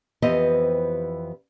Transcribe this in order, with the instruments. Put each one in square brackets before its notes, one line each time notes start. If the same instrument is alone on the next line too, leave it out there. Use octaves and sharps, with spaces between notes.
[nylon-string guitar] F2 E3 B3 G4 C5 D#5